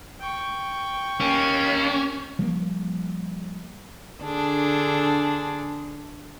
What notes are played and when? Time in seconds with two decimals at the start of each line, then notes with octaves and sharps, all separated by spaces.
0.20 G5 C#6
1.20 A#3 C#4 G4
2.39 F3 G3 A#3
4.21 D3 D4 G#4